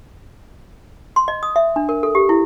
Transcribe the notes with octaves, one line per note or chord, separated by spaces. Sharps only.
C6
D#5
D#6
E5
D4
A#4
A4
G4
E4